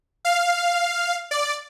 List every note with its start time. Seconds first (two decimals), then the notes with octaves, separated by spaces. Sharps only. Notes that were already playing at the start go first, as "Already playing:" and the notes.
0.25 F5
1.31 D5